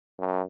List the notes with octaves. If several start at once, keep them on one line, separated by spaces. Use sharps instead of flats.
F#2